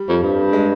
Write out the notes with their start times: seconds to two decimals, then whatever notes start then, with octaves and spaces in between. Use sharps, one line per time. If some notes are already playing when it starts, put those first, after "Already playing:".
Already playing: G3
0.08 F2
0.23 G2
0.53 G#3